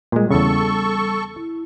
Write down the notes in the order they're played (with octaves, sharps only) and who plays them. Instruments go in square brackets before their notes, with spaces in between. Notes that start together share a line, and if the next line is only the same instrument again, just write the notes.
[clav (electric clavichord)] A#2 G#3 [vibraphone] G3
[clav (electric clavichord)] E2 C#3 [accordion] A4 C#6
[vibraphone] E4